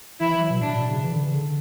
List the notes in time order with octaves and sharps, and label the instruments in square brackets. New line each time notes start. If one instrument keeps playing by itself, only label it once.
[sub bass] E3 [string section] E4
[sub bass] E3
F#3
B2
[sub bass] A2 [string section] D4
[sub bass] B2
C#3
E3
D3
C#3
D3